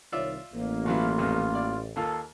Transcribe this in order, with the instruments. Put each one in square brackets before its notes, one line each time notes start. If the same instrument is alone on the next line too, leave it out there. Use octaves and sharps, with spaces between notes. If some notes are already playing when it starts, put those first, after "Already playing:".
[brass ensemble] C2 D#3 C#5 [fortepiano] F4 D5 E5
[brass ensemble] A1 [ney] A#3
[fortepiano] B2 E3 F#3 [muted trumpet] F4
[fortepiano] C2 F2 A#2
D5
[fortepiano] D#2 A#3 F4 [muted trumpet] A4